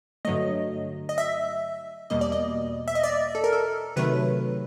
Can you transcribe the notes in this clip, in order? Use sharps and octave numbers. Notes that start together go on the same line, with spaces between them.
G2 D3 F#3 A3 D#5
D#5
E5
E2 B2 G3 A#3 D#5
D5
D#5
E5
D#5
D5
A4
A#4
A4
C3 D#3 F#3 A3 B4